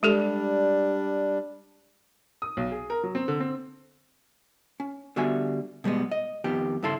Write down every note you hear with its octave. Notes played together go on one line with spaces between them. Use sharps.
G3 G#3 D4 G4 A4
D#6
B1
G#4
A#4
F#3
C4
D3
C4
C#4
D3 G3 B3 F#4 E5 G#5
B2 G3 G#3 B3
D#5
F2 D#3 B3 G4
G2 C#3 E4 A4 C6